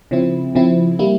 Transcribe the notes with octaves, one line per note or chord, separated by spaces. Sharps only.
C#3 F3 C4 E4
C#3 F3 C4 E4
G3 A#3 E4